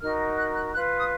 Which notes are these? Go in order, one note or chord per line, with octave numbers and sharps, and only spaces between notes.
D#4 F#4 A#4 F6
F#6
F#6
F4 B4 F#6
D#6